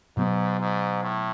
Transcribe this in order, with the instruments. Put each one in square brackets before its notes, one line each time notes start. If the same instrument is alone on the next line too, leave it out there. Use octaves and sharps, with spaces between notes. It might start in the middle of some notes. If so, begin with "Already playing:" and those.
[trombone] G#2 [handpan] B2 F#3 B3
[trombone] G#2
A2